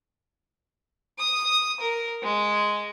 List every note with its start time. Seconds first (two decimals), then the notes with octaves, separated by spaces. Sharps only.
1.19 D#6
1.80 A#4
2.23 G#3